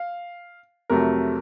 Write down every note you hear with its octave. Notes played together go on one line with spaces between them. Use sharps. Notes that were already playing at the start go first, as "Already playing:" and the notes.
Already playing: F5
F2 C3 F#3 A3 A#4